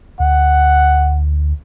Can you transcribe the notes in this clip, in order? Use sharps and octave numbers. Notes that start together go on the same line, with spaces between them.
D2 F#5